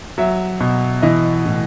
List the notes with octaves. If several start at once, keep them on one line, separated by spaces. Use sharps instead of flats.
F#3 E5
B2
E3 D#5
A2